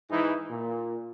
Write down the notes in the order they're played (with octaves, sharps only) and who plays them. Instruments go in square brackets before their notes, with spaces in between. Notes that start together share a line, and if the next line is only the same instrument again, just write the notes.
[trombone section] G#2 E3 D#4 E4
A#2